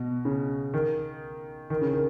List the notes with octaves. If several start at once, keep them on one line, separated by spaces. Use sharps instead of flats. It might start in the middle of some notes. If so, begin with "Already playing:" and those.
Already playing: B2
C#3
D#3
D#3
C#3
D#3